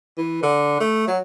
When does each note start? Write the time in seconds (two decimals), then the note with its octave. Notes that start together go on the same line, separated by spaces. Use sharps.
0.17 E3
0.43 D3
0.80 A3
1.07 F#3